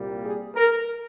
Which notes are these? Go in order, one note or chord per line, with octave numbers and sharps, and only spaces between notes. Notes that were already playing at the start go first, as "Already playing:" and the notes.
Already playing: C2 A#2 G3 A#3
G#4
A#4